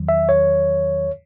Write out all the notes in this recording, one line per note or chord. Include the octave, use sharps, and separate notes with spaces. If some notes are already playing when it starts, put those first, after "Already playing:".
Already playing: E2 D#3 F#3
E5
C#5